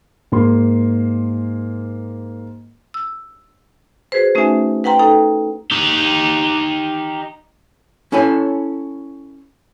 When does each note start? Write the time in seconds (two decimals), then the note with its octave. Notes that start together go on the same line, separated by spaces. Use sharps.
0.32 G#2 A#3 C6
2.94 E6
4.12 F#4 G#4 B4 C5
4.35 A3 C#4 D#4 F#4 E5 G#5
4.84 B4 F#5 G5 A#5 C6
4.99 D#4 A4 G5 A#5
5.71 D#4 G4
8.12 C#4 E4 A4 C#5 G#5